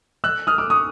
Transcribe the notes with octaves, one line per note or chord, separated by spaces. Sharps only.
E6 F#6
D#6 F6
D6 E6
C#6 D#6